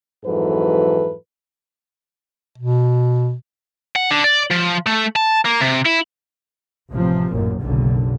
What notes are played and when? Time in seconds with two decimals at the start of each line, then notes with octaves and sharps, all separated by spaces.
0.25 F2 G#2 E3 F#3 A4 B4
2.58 B2
3.96 F#5
4.11 D3
4.24 D5
4.51 F3
4.86 A3
5.16 A5
5.45 A#3
5.61 C3
5.85 E4
6.92 A1 C3 F3
7.30 A1 F#2 A#2
7.61 F#1 B1 D3